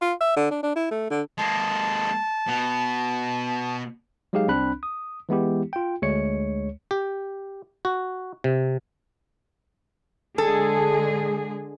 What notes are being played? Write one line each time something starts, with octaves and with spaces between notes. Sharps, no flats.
F4
E5
D3
D4
D4
E4
A3
D3
G#3 A#3 A5
B2
F#3 G#3 D#4 G4 G#4 F5
C2 C4 D4 B5 F#6
D#6
E3 G#3 B3 E4 G4
F4 G5
D2 G#3 C#5 C#7
G4
F#4
C3
D3 G#3 G#4 A4